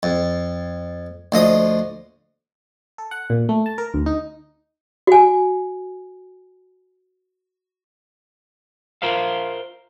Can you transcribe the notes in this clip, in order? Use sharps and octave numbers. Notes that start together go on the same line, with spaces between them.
F2
D2 F3 D#5 D#6
A4
F#5
A#2
A3
A5
A#4
D2
D#4
F#4 G#5
F4 A#4 C5 E5 F5